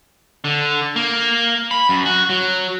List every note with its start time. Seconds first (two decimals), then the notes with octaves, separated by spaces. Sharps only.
0.45 D3
0.96 A#3
1.71 B5
1.89 F#2
2.06 F#4
2.30 F#3